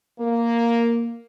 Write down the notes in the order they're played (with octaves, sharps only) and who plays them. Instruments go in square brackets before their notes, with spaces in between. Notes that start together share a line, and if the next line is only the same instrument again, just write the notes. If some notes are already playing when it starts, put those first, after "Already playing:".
[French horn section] A#3